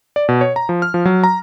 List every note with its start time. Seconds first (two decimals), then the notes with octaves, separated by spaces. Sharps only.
0.16 D5
0.29 B2
0.41 C#5
0.56 A#5
0.69 F3
0.82 F6
0.94 F3
1.05 F#3
1.24 A#5